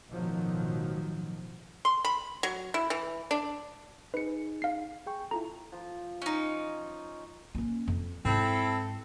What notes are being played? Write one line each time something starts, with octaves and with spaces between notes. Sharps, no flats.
A1 B2 D#3 F3 F#3
C6
B5
F#3
E4
E3
D4
D#4 G#4 B4 C#7
F5 C7
G#4 G5 C#6
E4 F4 A4 A#5
F3
C#4 D#4
A#3 C#4
F2
G#2 C4 E4 A4